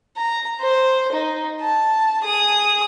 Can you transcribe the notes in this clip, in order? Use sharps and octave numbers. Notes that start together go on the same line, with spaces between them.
A#5
C5
D#4
A5
G#4 D#6